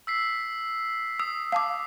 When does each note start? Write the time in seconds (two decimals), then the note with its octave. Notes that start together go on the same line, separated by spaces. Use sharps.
0.07 E6 B6 C7
1.20 D#6 E6
1.52 F5 A5 D6